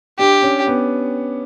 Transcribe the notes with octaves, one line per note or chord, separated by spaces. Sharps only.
D4 G4
C#4
B3